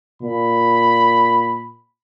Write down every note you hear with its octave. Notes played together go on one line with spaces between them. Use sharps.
A#2 B5